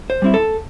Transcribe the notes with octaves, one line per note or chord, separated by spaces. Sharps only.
C5
G3 C4 E4
A4